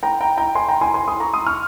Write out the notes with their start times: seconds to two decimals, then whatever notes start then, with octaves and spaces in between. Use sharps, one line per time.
0.03 G5 A#5
0.21 G5 A#5
0.37 G5 A#5
0.55 G#5 C6
0.68 G5 A#5
0.81 G#5 C6
0.94 G#5 C6
1.08 C6 D#6
1.20 A#5 C#6
1.34 C6 D#6
1.47 C#6 F6